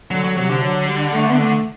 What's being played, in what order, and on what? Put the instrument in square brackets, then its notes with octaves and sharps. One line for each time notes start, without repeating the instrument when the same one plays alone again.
[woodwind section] D3 [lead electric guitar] F#3
[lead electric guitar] F#3
[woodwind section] C3 [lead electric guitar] F#3
[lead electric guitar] D3
[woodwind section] F#3
G3
A3
B3
A3